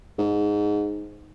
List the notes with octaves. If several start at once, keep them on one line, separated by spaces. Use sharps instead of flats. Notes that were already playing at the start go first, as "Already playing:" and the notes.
G#2